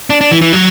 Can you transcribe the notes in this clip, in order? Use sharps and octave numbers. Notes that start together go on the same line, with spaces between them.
D4
D4
E3
E3
F#3